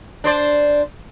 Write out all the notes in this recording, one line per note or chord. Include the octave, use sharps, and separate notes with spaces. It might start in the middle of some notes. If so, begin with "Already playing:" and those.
D4 C5 D5